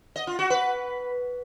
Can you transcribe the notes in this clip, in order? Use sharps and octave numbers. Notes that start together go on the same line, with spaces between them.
D#5
F4
F#4
B4